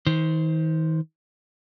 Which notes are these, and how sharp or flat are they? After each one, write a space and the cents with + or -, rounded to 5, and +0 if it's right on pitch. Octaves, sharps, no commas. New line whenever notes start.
D#3 +40 C5 +0